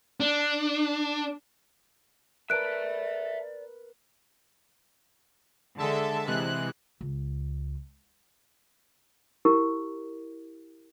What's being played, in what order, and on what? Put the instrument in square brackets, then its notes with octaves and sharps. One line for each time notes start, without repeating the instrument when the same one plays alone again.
[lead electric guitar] D4
[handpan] A#4 B4 [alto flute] D5 [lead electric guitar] E5 A5 [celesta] F#6 D7
[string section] D3 G#3 A4 [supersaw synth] E5 A5
[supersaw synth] C3 E3 G#3 [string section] F#6
[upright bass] C#2
[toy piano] E4 G4 A#4